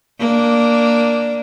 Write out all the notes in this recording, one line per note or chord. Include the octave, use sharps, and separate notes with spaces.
A#3 D4